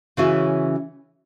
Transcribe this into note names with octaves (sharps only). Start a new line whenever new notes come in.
C#3 E3 C#4 F#4 E5